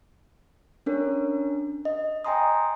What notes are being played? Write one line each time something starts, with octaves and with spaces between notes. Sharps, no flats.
C#4 D4 A#4 C#5
D#5
D#5 G5 G#5 A#5 C6 D#6